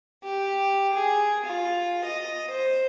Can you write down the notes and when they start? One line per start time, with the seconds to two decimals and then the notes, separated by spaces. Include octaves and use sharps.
0.23 G4
0.94 G#4
1.46 F4
2.04 D#5
2.51 C5